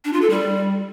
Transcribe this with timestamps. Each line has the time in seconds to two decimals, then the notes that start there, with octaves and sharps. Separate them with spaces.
0.05 D4
0.13 F4
0.21 A4
0.30 G3